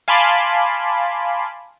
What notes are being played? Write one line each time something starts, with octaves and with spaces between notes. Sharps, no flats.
F5 G#5 A5 B5 C6 D6